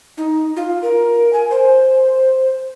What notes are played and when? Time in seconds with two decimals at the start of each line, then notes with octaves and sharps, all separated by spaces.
0.17 D#4
0.56 F4
0.82 A#4
1.33 G#5
1.50 C5